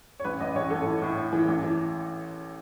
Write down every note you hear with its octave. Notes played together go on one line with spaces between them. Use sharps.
C#5
A1 B4
A1 D#5
A1 C#5
A1 A4
E3
A2
A2
E3
A1
E3